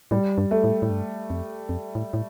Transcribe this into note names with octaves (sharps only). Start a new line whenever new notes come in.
A2 G3
G2
A3
A2
A2
G2
F2
F2
A2
A2